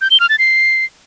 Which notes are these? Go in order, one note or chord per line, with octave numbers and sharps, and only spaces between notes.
G6
G7
F6
A6
C7